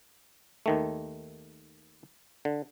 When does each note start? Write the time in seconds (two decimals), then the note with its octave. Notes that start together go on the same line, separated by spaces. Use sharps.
0.66 D#2 D#3 A3
2.45 D3